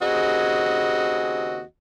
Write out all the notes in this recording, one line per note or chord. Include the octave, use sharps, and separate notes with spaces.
D#2 C#3 C4 F#4 G#4 D#5